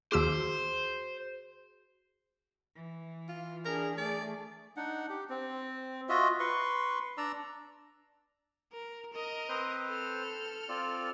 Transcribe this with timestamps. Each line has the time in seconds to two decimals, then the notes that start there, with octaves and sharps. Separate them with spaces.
0.12 D#2 F#4 G#4 C5 E6 B6
2.74 E3
3.29 F4
3.65 D4 G#4 A#4
3.98 A3 G#4 D5
4.77 D4 D#4 F#5
5.10 G4
5.29 C4
6.09 F4 F#4 D#5 E5
6.40 B4 C6 C#6
7.17 D4 D5 A#5 E6
8.72 A#4
9.13 A#4 D#5
9.49 C4 B4 C5
9.88 A4 F6
10.69 C4 F4 D5